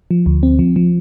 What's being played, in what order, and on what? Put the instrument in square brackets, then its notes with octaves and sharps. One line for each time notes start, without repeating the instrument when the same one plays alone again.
[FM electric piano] F3
D2
C4
F3
F3